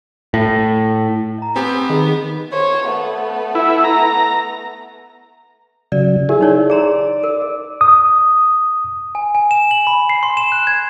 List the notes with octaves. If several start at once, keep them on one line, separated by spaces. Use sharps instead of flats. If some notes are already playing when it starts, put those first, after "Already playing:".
A2
D#5 A#5
B3 C4 G4 G#5
D#3 G#4 D#5 B5
C5 C#5
A3 B3
E4
A#5
C#3 F#3 D5
E4 G4 G#4 A#4
D#4 C#5 D5
G#4 D5 A#5 C6
A#4
D#6
G#5
G#5
E7
F#7
B5
C7
C6
E7
F#6
G#6